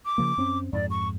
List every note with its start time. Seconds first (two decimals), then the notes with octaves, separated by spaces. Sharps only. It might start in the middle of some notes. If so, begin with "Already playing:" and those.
0.05 D6
0.18 C#3 F3 A#3
0.37 F#2 C4 C#4
0.73 F2 G#2 D5
0.90 C#6